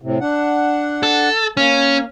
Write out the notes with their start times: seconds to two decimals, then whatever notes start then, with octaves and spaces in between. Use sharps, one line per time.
0.02 A2 C3
0.21 D4 F#5
1.03 A4
1.57 A#3 C#4